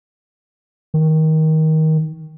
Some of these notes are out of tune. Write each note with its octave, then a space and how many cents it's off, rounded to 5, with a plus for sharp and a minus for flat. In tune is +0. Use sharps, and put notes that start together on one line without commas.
D#3 +20